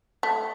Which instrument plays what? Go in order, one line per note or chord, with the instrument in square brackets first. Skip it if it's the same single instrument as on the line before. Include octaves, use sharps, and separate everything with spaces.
[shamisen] A3